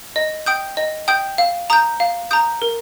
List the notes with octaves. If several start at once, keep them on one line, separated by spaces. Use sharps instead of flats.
D#5
G5 D#6 G6
D#5
G5 D#6 G6
F5
A#5 D#6 G6
F5
A#5 D#6 G6
A#4